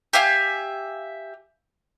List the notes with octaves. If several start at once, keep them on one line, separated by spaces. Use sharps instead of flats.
G4 E5 F5 G#5